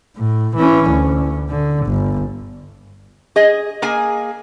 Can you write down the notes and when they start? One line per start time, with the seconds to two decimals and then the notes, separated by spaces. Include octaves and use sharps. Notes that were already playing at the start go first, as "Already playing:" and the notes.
0.17 A2
0.56 E3 C#4
0.90 D2
1.50 D3
1.87 G1
3.36 G#4 D#5
3.82 A#3 G#4 G#5